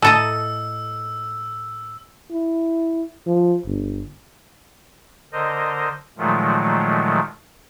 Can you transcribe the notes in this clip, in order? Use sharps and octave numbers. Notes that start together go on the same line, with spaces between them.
A2 A4 D#5 A5 A#5 E6
E4
F3
G1
D3 A#4 C5 D#5
A#2 D#3 F3 F#3 G#3 A3